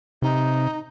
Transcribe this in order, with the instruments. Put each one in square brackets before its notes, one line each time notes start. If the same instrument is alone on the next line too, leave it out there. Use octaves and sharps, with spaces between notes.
[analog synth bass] C3 [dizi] D#4